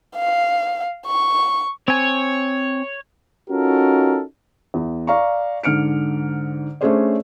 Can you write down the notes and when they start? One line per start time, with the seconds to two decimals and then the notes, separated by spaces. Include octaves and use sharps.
0.16 F5
1.07 C#6
1.88 C4 C#5 G#5
3.49 C#4 D#4 F4 F#4 A4 A#4
4.74 E2
5.07 D5 F5 A#5 C#6
5.63 G#2 D3 F6 C#7 D7
6.81 A3 C#4 D4 G#4 C5 D5